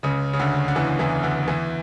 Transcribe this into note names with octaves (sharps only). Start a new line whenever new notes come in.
C#2 C#3
C#3
D2 D3
D3
E2 E3
E2 E3
D2 D3
E2 E3